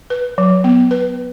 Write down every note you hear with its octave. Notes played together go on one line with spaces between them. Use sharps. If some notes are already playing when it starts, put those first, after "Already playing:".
B4
F#3
B3
B4